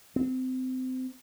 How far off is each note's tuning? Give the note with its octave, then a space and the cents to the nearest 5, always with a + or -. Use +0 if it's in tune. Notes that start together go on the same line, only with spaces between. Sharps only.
C4 -25